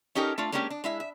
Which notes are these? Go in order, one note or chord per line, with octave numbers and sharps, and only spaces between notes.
C#4 D#4 G4 A4 A#4
A3 D4 F4
G#3 A#3 C#4 D4 F#4 G4
D4
G#3 E4 E5
E5